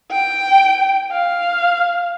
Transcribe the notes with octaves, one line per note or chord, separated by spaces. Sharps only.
G5
F5